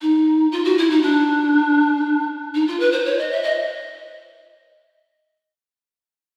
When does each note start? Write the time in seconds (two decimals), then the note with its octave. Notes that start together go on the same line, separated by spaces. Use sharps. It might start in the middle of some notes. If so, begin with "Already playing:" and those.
0.01 D#4
0.52 F4
0.64 F#4
0.78 E4
0.90 D#4
1.02 D4
2.54 D#4
2.67 F4
2.80 B4
2.92 C5
3.05 C#5
3.18 D#5
3.31 E5
3.43 D#5